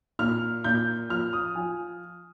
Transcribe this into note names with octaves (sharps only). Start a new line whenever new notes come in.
A#2 F6
A#2 G6
F3 F6
D#6
F3 G#5